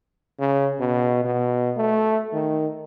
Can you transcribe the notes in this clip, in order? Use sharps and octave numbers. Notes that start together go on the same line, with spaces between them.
C#3
B2
B2
A3
D#3